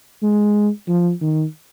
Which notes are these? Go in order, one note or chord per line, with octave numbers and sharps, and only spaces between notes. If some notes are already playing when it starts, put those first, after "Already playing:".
G#3
F3
D#3